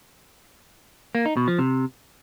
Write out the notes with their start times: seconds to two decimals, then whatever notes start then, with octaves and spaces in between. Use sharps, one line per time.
1.15 A#3
1.26 D#4
1.37 B2
1.48 F3
1.59 C3